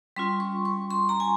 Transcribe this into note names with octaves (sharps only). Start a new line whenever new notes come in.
G3 C#4 F4 C6
C#6
C#6
C6
A#5
G#5